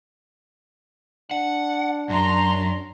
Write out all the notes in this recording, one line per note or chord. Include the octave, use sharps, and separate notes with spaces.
D4 F#5
F#2 A#5 C6